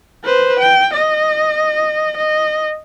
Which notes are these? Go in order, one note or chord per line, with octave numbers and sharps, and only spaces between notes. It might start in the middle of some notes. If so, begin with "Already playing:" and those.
B4 C5
G5
D#5
D#5